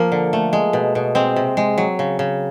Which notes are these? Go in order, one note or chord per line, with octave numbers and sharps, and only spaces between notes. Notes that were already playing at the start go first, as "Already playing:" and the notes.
Already playing: F3 A#3
D3
A3
G#3
B2
B2
G#3 C4
C3
G#3
F#3
C#3
C#3